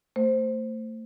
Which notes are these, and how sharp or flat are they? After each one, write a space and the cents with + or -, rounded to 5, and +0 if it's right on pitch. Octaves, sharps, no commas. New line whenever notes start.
A3 +35 C5 +0